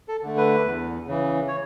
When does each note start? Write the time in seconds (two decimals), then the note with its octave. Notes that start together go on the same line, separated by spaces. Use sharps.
0.08 A4
0.23 D3 A3
0.37 B4
0.64 E2
1.06 C#3 E3
1.48 C#5